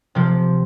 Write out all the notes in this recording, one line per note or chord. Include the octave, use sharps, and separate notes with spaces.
C3 F3